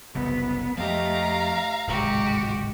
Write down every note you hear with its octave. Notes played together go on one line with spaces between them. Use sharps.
F#1 C2 C#3 B3
F2 F3 A3 G4 D#5 F5 A#5
D1 G#1 C3 G#3 F#4 G4